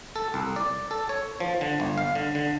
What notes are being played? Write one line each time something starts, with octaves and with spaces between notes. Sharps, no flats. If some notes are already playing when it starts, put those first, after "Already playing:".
A4
C2
D5
A4
C#5
F3
D3
G1
F5
D3
D3